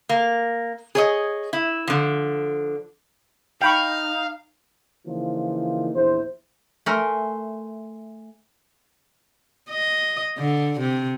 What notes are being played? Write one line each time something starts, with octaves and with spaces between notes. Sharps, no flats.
A#3
G#4 C#5 D#5
E4
D3 F3
D#4 F5 G5 B5 C#6
C#3 E3 F3 A#3 D#4 F4
A#1 E2 E4 C5
A3 A#4 E5 G#5 C6
D#5
D3
C3